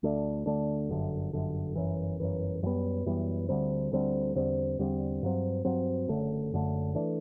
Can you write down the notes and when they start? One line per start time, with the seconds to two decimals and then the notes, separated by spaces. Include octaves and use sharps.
0.03 D2 D3 A3 D4
0.46 D2 D3 A3 D4
0.89 G1 F#2 D3
1.33 G1 F#2 D3
1.75 G1 F#2 E3
2.20 G1 F#2 E3
2.63 F#2 E3
2.66 G3 B3
3.06 F#2 E3 G3 B3
3.49 D2 D3 G3 C4
3.92 D2 D3 G3 C4
4.35 E2 D3 G3 C4
4.79 E2 D3 G3 C4
5.23 G2 F#3 C4
5.65 G2 F#3 C4
6.08 F#1 F#2 D3 A3
6.52 F#1 F#2 D3 A3
6.95 E3 A3 D4